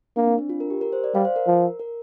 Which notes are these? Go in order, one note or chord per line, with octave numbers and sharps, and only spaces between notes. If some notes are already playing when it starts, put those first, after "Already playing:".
A#3 D4
C4
D4
F4
A#4
G4
A#4
C5
D5
G3 F5
C5
A#4
F3
A#4